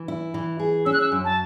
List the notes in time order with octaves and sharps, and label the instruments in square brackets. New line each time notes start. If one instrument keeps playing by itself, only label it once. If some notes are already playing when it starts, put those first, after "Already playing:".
Already playing: [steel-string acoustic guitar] E3
E4
E3
G#4
[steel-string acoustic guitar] C#4 [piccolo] E6
[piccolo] F#6
E6
[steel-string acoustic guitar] F#2
[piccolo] A5